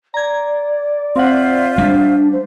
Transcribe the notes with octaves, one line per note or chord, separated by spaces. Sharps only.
D5 A#5 G#6
C4 F4 C5 E5 F#5
G3 D4
C5